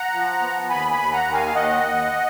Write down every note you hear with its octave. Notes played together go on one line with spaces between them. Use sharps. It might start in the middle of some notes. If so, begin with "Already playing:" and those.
Already playing: F#5 A#5
F3
B3
D#2 G#5 B5
G#5 B5
D#2
F#5 A#5
D#3
F5 G#5
F5
D#2 D#5 F#5
D#2